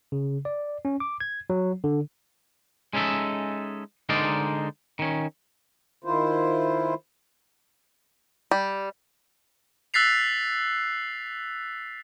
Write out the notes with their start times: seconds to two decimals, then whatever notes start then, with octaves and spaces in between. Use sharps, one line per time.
0.12 C#3
0.45 D5
0.85 C#4
1.00 D6
1.20 G#6
1.50 F#3
1.84 D3
2.93 G#3 C#4 D#4 A4 E5
4.09 D3 G#3 D#4 A#4 C5 D5
4.99 D#3 C#4
6.04 D#3 E4 F4 C5
8.51 G3
9.94 E6 F#6 A6 B6 C7 F7